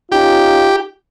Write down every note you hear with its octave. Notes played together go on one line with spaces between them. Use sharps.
C#4 D#4 F4 G4